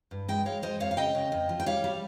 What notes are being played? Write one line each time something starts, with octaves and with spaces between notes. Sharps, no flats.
G2
G#3 D#5 G5
G#3 C#5 F5
G#3 C5 D#5
F2 C#5 F5
F5
C#3 D#5 G5
C#3
F2
F3
G5
G3 C#5 F5
G3